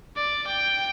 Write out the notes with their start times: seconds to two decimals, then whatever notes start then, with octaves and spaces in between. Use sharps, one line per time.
0.16 D5
0.47 G5